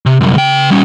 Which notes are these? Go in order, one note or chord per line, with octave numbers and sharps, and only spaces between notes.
C3
C2 F#2
C#3 G5
G3 C#4